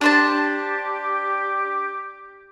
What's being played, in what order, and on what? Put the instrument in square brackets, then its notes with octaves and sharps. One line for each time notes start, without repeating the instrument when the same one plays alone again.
[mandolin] D4 C5 A5 [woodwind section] G4